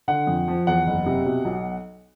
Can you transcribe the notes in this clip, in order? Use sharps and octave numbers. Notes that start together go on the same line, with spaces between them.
D3 F#5
F2
F3
E2 F#5
F#1
C3
B2
B1